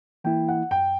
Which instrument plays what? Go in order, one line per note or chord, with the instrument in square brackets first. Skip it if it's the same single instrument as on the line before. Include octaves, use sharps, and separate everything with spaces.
[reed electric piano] E3 A#3 E4 [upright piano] G5
[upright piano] F#5
[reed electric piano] F#2 [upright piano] G5